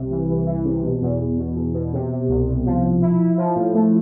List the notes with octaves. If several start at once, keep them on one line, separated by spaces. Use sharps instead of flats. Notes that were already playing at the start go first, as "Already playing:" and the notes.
Already playing: C2 C3
E3
E3
E3
C3
B2
E2
E2
B2
E2
B2
C3
C3
C2
C2
F3
F3
E4
E4
F3
A2
A3